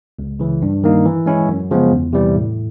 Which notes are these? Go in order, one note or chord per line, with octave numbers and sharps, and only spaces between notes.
C#2
C#3 E3
G2
D#3 G3 A#3 D#4
E3
G#3 C#4 E4
F#2
C#3 F3 G#3 B3
E2
C3 E3 G3
A2